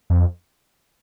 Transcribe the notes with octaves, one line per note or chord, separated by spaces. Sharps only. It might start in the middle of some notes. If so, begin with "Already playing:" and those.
F2